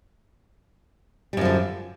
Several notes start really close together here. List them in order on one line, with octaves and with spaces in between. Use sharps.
G3 F#2 F3 D3